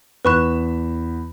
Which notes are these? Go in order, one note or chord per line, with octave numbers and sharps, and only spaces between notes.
E2 B4 B5 C#6 F#6 E7